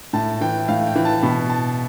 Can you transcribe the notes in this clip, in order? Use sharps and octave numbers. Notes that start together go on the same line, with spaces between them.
A2 A5
E3 G5
A2 F5
G5
E3
A5
B2 B5
A5